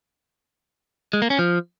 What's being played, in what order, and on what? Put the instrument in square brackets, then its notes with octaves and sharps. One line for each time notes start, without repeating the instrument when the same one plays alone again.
[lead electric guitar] G#3
A#3
C#4
F3